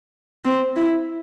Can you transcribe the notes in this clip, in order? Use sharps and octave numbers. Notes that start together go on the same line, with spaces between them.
C4
E4